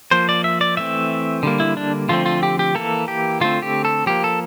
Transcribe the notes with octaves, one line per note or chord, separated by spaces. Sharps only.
F3 A#3 C5
D5
E5
D5
E3 A3 C4 E5
D3 G3 A#3
E4
D4
D3 F3 A3 C4 F4
F4
G4
G4
E3 A#3 A4
G4
D3 A3 C4 F4
G4
A4
F3 A#3 G4
A4